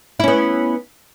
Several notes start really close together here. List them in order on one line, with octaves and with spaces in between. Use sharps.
E4 C#4 B3